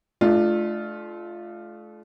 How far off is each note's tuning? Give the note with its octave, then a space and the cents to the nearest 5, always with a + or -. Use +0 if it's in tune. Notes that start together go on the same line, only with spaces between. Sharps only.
A3 -35 D4 +25 F4 -5